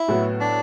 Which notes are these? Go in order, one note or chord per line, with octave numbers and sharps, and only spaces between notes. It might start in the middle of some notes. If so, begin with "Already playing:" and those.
Already playing: E4
A2 F#3 B3 F#4
D4